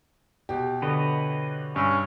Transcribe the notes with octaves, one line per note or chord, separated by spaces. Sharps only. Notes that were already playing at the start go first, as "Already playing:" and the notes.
B2 G4
D3 B4 C#5 D#5
G2 C#4 C#5 E6